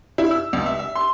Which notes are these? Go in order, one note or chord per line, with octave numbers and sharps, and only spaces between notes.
E4
E6
C#2
E5
E5
C6